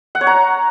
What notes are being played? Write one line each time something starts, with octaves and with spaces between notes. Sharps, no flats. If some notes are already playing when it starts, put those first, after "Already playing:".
F#5
C#5
A#5